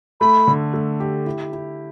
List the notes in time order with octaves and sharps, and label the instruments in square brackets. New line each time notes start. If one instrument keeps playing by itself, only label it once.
[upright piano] A3 [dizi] B5
[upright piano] D3
A3
G4
E4
E4